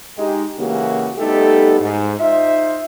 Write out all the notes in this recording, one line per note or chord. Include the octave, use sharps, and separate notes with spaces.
G#3 D#4 G4
C#3 E3 G#3 A#3 F#4 G4
G3 A3 B3 D#4 G4 A4
G#2
D#4 F4 C5 E5